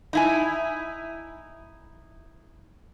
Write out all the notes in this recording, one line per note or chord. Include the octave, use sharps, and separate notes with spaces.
D#4 E4 G#5